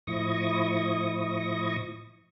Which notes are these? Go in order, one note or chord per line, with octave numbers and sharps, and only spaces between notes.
A2 F3 E4 D#5 C#6 D#6